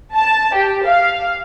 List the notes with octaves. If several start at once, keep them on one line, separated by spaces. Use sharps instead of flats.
A5
G4
F5